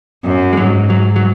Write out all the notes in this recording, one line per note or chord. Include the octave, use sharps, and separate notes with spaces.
F#2
G#3
G#2 F#3
F#3
F#3